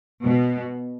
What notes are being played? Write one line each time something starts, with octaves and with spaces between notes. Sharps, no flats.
B2